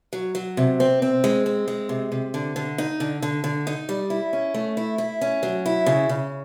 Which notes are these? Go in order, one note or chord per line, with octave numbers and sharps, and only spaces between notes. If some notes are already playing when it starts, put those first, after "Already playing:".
F#3
F#3
C3
C4
C4
G#3
C4
G#3
C3
C3
D3
D3
D#4
D3
D3
D3
D#4
G3
E4
C#4
A3
E4
E4
C#4
F#3
E4
C#3
C#3